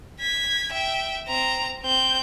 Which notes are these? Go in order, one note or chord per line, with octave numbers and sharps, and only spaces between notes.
G#6 B6
E5 G5
C4 A#5
C4 G6